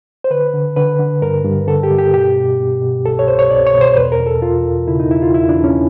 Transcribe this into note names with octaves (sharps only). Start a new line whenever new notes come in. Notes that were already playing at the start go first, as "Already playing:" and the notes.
C5
D3 B4
D3
D3 B4
D3
G2 A#4
G2
D3 A4
G4
G2
G4
B2 G4
B2
B2
B2
C2 A4
C#5
C2 C5
C#5
C2 D5
C#5
B2
C5
E2 B4
A#4
E2
A4
E2 F4
E2
C#3 E4
D#4
E2 E4
F4
E2 E4
D4
E2
C#4